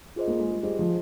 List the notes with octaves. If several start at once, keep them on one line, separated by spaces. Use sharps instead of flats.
F4 G#4 C5 D#5
A#3
G#3
G3
G3 F4 G#4 C5 D#5
F3